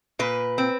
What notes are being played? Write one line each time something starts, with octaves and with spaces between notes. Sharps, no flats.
A#2 B4
C4